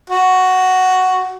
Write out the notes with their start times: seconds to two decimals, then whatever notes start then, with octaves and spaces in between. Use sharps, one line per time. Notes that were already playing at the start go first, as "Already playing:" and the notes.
0.10 F#4